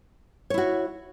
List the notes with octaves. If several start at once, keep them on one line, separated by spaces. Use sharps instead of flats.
E4 F#4 C#5